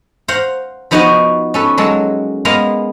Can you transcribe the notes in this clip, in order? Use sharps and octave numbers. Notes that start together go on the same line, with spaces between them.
C5 F5 F#5 A#5
F3 B3 D#4 F#4 C#5 D#5
C#4 A4 B4
F#3 G#3 A#3 A4
G#3 A#3 B3 F5 A#5